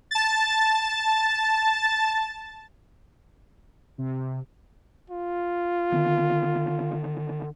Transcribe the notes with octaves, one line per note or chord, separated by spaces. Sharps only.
A5 A6
C3
F4
D3 D#3 B3